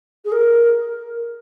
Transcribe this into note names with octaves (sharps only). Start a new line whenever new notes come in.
G#4
A#4